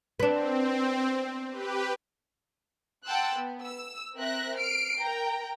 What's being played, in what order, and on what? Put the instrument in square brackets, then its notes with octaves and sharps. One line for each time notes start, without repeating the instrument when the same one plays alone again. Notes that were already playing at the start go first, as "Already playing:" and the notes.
[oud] B3 D4 [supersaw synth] C4
[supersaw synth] G4 B4
[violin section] F#5 G5 A5 C6 E6 F#6
B3
E6
C4 A#4 E5 F#6 A#6
F6 C7 D7
A#4 G5 A#5